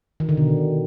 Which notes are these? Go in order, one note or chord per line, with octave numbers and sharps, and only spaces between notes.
D#3
D3
B2